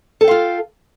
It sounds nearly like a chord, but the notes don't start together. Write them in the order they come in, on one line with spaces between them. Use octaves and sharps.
A4 G5 F5 F4